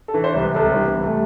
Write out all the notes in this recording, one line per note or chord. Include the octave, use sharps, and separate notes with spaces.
A4
E3
C5
C2
B4
C2 A4
C4
E3
B3
C2
A3